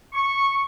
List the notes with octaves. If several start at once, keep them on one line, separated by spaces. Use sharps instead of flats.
C#6